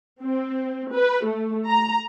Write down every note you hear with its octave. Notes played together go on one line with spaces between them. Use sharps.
C4
B4
A3
A#5